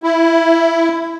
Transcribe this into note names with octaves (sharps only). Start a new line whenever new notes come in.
E4